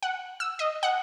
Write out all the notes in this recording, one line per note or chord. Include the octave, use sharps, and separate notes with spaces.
F#5
E6
D#5
F#5